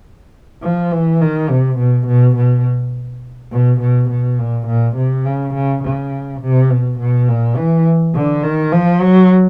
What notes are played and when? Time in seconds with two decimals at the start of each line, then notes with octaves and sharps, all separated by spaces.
0.62 F3
0.91 E3
1.21 D#3
1.50 C3
1.78 B2
2.07 B2
2.37 B2
3.52 B2
3.81 B2
4.10 B2
4.39 A#2
4.67 A#2
4.96 C3
5.25 C#3
5.54 C#3
5.83 C#3
6.41 C3
6.70 B2
6.99 B2
7.28 A#2
7.56 E3
8.15 D3
8.43 D#3
8.72 F3
9.01 F#3